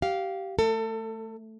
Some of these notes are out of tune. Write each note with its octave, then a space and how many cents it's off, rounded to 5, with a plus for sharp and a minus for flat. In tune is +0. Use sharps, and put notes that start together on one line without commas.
G4 -20 F5 +0
A3 +0 A4 +30